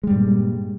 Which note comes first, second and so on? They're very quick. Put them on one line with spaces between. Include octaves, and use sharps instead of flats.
G#3 G3 G2 A#2